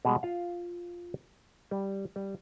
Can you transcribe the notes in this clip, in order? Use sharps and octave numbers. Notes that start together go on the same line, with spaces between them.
B2 G3 G#3
F4 F5
G3
G3